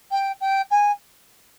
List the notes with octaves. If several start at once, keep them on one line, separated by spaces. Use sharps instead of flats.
G5
G5
G#5